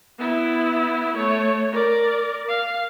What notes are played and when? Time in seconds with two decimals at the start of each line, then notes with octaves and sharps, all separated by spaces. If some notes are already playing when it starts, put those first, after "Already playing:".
0.18 B3 E4
1.16 A3 C#5
1.71 A#4 D5
2.49 F5